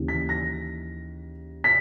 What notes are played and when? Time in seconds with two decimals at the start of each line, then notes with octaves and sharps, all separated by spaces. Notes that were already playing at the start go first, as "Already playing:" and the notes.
Already playing: D#2 C#3 E3
0.08 B6
0.29 A#6
1.64 B6